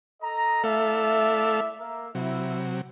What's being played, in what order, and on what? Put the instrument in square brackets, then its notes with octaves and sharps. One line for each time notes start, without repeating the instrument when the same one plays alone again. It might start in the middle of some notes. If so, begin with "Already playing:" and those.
[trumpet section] A4 D#5 A#5
[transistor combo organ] A3 A4 F5 [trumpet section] E4 D5 E5
[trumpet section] A#3 A#4 E5
[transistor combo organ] C3 F#3 [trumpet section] E4